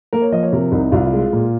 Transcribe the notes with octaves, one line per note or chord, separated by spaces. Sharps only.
A#3 A#4
C#5
F3 D#5
C#5
C3 A#4
C2 D#4
C2 F4
F4
G#3
F4
A#2